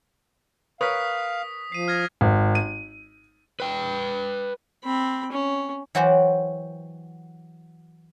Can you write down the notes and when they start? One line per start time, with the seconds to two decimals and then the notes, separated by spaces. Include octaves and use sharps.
0.81 A#4 B4 C#5 F5 D#6 B6
1.72 F3 C7 D#7
1.88 F6 G#6 A#6
2.21 G#1
2.55 D#7
3.60 B4 G5
4.84 C4 B5
5.32 C#4
5.95 E3 F#3 F#4 G4 C5